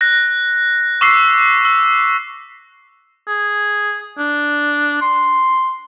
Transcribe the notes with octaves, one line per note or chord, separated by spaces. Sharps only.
F#6 A#6
C#6 D6 E6 B6 C7
E6
G#4
D4
C6